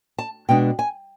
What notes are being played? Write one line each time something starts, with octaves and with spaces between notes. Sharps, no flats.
A5
B2 G#3 B3 D4 G5
G#5